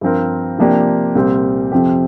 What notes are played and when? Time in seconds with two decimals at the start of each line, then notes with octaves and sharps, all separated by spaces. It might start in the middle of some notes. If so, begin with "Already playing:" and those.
0.01 G2 F3 C4 G4 A#4
0.59 C3 F3 A#3 D4 G4
1.15 C2 A#2 G3 C4
1.72 F2 C3 F3 C4 G4